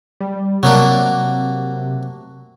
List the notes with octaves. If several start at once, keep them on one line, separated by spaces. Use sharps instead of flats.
G3
C3 F#3 A#3 D4